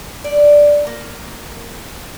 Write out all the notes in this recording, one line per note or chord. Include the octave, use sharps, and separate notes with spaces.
D5
A#3